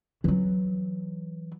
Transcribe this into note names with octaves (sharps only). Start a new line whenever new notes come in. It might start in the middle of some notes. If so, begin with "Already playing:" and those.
E3 F#3